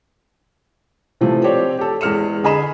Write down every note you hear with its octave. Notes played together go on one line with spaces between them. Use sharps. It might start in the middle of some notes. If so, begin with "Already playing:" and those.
C3 E3 F3 A3
C4 G4 C#5 D5
G4 A4
E2 G#3 F6 C#7 E7
D3 G#4 D#5 B5 E7